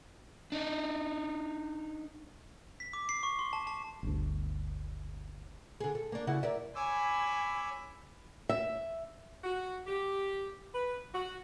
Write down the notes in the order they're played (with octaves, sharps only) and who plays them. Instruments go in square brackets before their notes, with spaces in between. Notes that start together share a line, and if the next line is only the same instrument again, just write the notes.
[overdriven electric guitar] D4 D#4
[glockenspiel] B6
D6
C7
C#6
C6
A5
A5
[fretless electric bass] G1 D2
[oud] D3 G#4
A4
A#3 D4
C#3 E4 F#4
A#4 D5 E5
[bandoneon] C#5 D6 E6 [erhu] G#5 [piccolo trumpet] B5
[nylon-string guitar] E5
[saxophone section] F#4
G4
B4
F#4